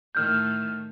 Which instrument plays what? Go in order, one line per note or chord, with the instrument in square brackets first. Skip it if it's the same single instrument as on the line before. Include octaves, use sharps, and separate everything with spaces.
[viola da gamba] A2 D#3 A3 [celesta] F6 G6